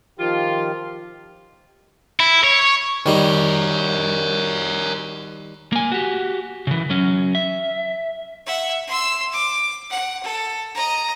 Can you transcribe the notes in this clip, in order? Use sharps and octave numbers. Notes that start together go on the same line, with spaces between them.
D#3 F3 F4 G4
E4
C#5
D#3 G3 A#4 C#5
A#3 G#5
F#4 G4
C#3 E3
F#3 C#4
E5
E5 F#5
C6 E6
D6
F#5
A4
D#5 A#5